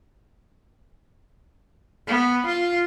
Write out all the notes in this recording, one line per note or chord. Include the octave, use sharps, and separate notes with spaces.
B3
F4